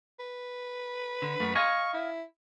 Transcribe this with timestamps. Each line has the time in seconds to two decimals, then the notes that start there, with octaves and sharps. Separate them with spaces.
0.19 B4
1.22 D3
1.40 F#2 A3
1.55 D#5 F5 G#5 C#6
1.93 E4